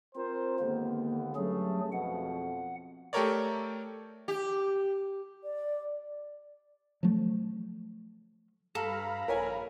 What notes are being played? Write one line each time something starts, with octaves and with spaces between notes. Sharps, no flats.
C4 F4 A#4 C5
D#2 G#2 D3 A#3 B3
G2 F#3 A3 C#4 G#4
F2 B2 F#5
A3 G4 A4 A#4 C#5 D5
G4
D5
F3 F#3 A3
G2 A4 F5 A#5 B5
A#1 A#4 C#5 G#5